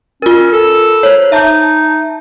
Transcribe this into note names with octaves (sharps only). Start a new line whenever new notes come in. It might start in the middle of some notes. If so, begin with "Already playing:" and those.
C#4 F4 A#4
A4
C5 C#5
D#4 E5 A5 G6